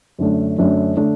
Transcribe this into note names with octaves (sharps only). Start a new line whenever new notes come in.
F#2 D3 A3 D4
F#2 D3 A3 D4
D3 A3 D4